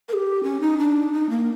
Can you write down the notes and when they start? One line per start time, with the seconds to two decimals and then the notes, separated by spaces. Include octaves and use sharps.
0.09 A#4
0.13 G4
0.43 C#4
0.61 D#4
0.78 D4
1.12 D#4
1.30 A#3